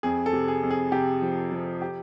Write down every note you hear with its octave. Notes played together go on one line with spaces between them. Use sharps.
F2 G#4
A4
C3
G#4
F2
G#4
C3 G4
F3
F3
G4